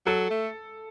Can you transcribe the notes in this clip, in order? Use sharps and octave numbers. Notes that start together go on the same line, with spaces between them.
F#3 A4
A3